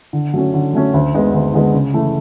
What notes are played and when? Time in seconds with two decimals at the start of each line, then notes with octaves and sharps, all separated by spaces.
0.13 D3
0.34 F#3 A3 C#4
0.54 D3
0.73 F#3 A3 C#4
0.94 D2
1.14 D3 G#3 B3
1.34 D2
1.53 D3 G#3 B3
1.74 C#3
1.93 E3 A3